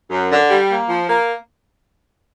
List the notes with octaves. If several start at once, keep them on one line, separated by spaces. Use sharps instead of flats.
F#2
D3
G3
A#3
F3
A#3